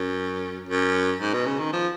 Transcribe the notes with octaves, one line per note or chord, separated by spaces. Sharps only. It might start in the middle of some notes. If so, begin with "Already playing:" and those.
Already playing: F#2
F#2
G#2
B2
C#3
D#3
F3